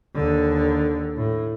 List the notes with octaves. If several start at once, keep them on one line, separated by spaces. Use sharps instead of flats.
D#2 D3
A2